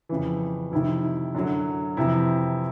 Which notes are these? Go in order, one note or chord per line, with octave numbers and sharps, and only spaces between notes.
F2 C#3 E3
F2 C3 D#3 E4
F#2 D3 F#3
F2 C3 E3 E4